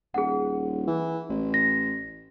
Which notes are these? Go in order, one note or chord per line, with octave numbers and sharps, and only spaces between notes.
D#1 G#4 F#5
E3
A1
A#6